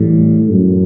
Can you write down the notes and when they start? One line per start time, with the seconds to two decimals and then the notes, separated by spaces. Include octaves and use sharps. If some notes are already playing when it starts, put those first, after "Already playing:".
Already playing: A2 E3 G3
0.51 F#2